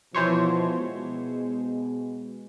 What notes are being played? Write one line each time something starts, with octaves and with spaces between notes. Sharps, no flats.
B2 E3 F3 C5 C#5
B2 G#3